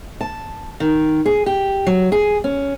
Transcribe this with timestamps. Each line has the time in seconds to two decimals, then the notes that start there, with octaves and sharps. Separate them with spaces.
0.21 A5
0.80 D#3
1.26 G#4
1.46 G4
1.87 F#3
2.12 G#4
2.44 C#4